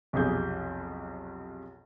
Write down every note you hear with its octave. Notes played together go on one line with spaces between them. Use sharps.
B1 F2 C3 G#4 G6